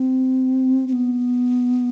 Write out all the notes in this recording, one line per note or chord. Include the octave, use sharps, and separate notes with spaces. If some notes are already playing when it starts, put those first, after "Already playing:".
Already playing: C4
C4
B3